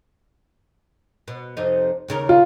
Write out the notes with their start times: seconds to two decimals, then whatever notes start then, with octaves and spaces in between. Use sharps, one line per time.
1.28 B2
1.57 F2 C3 D#4
2.08 D#2 C#3 A#4
2.29 F4